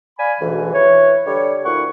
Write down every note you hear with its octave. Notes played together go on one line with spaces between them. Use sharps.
D5 F5 G#5 B5
D2 G#2 B2 E3
E4 B4 C#5
D3 G3 C#5
D2 A#2 E4 F#5 C#6